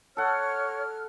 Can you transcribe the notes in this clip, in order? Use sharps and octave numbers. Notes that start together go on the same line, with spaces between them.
A4 C#5 F#5 F6